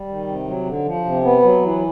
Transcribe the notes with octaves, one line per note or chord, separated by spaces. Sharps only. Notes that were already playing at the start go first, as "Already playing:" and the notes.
Already playing: G3
D#3
C3
F#3
D3
F3
C3
B3
F#3
E3